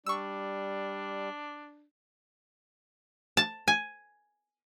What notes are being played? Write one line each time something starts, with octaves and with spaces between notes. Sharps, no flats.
G3 D4 C#6 E6
A5
G#5